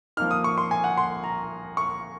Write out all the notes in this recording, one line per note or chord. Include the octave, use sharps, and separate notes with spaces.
F3 A#3 D#4 F6
D#6
C#6
C6
G#5
F#5
C6
A#5
C#6